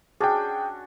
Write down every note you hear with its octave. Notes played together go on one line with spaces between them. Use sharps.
C#4 D4 F#4 G#4 G5